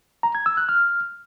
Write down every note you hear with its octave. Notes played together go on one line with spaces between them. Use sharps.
A#5
G#6
E6
F#6
F6